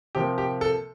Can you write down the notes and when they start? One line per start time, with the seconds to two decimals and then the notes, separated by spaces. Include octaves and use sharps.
0.15 C3 F3 A#3 G4
0.38 G4
0.61 A4